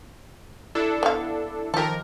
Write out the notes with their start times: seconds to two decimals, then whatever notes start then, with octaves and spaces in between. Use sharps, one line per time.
0.75 D4 E4 A4
1.03 B3 F5
1.74 D#3 F3 G4 A4 A#4